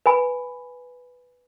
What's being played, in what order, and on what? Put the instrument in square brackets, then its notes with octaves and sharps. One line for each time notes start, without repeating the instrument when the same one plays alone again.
[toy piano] B4 G#5 B5